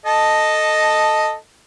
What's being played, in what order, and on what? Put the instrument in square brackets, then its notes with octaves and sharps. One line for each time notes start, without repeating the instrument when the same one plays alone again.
[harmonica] A4 D#5 A5